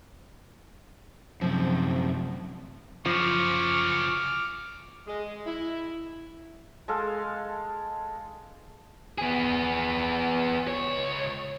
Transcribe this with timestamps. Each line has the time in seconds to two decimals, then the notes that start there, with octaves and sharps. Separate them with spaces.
1.41 F#2 C3 F3
3.06 F#2 C#3 F3 C#6 D6 F6
5.07 G#3
5.46 E4
6.88 G#3 A4 F5
9.18 B3 G#4
10.68 C#2 C#5